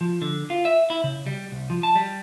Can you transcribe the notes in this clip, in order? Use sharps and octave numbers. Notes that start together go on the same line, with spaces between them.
F3
D3
F4
E5
E4
C#3
G3
C2
F3
A5
G3